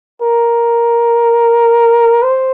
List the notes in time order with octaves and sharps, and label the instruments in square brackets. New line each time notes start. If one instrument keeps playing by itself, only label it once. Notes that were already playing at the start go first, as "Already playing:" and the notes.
[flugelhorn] A#4
C5